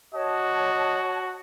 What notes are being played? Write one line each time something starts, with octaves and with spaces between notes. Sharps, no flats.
F#4 C#5 D#5 A5